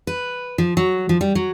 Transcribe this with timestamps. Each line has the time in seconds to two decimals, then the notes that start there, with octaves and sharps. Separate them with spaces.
0.07 B4
0.58 F3
0.77 F#3
1.09 F3
1.21 G3
1.35 F#3